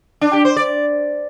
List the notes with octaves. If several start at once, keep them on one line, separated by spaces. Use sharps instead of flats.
D4
G4
C5
D5